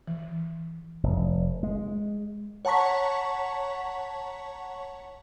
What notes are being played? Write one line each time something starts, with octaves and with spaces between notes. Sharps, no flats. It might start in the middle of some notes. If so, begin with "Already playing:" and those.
E3
F1
G#3
C#5 F#5 A5 A#5 C#6 B6